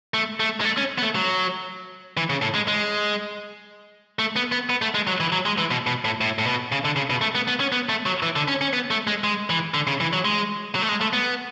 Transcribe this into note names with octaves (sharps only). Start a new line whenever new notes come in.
A3
A3
G#3
A3
C#4
B3
A3
F#3
E3
C#3
A2
G#3
G#3
A3
B3
B3
B3
A3
G#3
F#3
E3
F#3
G#3
E3
B2
B2
A2
A2
A2
B2
C#3
D3
C#3
B2
A3
B3
B3
C#4
B3
A3
F#3
E3
D3
C#4
C#4
B3
A3
G#3
G#3
E3
D3
C#3
E3
F#3
G#3
F#3
A3
G#3
A3
B3